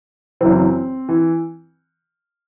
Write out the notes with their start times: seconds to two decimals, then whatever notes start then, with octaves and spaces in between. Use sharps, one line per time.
0.41 F#1 F#2 E3 C4
1.09 E3